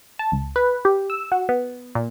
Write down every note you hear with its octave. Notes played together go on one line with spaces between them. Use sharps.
A5
C#2
B4
G4
E6
F#4
B3
A#2